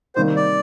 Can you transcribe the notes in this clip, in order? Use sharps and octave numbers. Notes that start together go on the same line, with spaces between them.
C3 D#3 G3 A#3 C5
D5